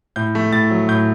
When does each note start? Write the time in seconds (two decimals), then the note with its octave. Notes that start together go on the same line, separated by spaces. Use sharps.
0.16 A2 G6
0.35 A3
0.52 A2 A6
0.70 F#3
0.88 A2 G6